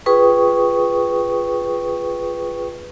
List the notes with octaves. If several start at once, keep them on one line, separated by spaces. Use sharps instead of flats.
F4 G#4 B4 G5 C#6 D#6